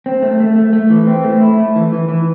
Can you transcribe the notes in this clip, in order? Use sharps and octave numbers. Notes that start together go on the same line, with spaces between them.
C4
A3
A3
A3
A3
E3
C4
A3
E4
A3
E3
E3
E3